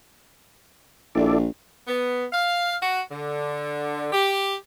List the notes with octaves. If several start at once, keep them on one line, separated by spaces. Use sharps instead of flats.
A#1 E4 A4 D5
B3
F5
F#4
D3
G4